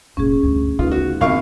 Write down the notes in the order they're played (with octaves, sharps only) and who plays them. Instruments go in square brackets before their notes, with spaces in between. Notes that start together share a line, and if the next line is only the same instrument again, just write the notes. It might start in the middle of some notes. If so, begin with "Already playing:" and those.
[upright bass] F1 A#2 [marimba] C#4 G#4
[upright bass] D2 G2
[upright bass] D2 C#3 [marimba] D#4 B4 [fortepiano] F4
[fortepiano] F#4
[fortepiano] A#1 F5 C#6 [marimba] A#2 C4 [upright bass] D3 D4